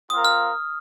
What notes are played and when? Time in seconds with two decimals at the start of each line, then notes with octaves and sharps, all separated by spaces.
0.10 C4 F4 A#4 F5 D#6
0.25 F6